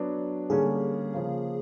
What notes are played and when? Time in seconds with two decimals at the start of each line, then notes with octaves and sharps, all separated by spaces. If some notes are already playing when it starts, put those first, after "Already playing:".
Already playing: F#3 B3 D4
0.50 D3 G3 A#3 C#4 G#4
1.14 C#3 F3 A#3